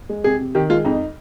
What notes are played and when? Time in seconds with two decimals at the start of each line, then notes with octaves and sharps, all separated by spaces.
0.09 G#3
0.24 C3 G#4
0.39 C3
0.55 D#3 G4
0.70 G#3 F4
0.85 F2 D#4